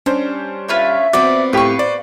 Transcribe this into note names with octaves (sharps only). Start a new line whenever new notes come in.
G3 C#4 D4 C5
F4 B4 C#5 E5
F3 B3 C4 F#4 D5
A2 G4 B4 F5 G5 C#6
C5 D5